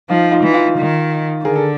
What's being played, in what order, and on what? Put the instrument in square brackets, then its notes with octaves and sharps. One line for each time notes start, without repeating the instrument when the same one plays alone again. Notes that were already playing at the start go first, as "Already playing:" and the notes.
[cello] F3 [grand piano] D#4 F4
[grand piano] D#4 F4
[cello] E3
[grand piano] D#4 F4
[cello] D#3
[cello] D3 [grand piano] G#4 A#4
[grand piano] A4